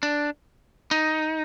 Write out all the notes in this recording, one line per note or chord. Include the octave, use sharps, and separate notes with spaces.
D4
D#4